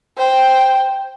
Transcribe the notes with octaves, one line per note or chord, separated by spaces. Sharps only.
C5 G5